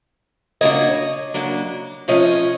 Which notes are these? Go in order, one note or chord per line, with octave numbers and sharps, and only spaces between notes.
C#3 F#3 A#3 D4 C#5 D#5
C#3 F#3 A#3 D4
C3 F3 A3 C#4 C#5 D#5